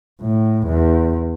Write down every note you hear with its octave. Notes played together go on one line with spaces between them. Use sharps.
A2
E2